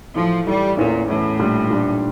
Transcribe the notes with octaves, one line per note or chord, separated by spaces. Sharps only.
A2 E3 F3 A3
A2 E3 G3 A3
E2 A#2 E3 A3 C#4
E2 A2 E3 A3 C#4
A#2 G3 D4
A#2 G3 D4